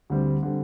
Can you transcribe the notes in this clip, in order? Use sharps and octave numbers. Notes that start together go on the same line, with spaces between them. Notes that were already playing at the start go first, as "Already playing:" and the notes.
D2 D3 G3 C4
D3 G3 C4